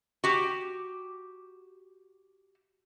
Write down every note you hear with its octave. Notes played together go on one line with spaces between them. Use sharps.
F#4 G4